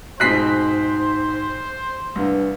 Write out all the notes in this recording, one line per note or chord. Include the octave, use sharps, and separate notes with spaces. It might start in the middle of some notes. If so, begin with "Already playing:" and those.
G#2 B2 G#3 C4 C5 F#6 B6 C7
C2 G2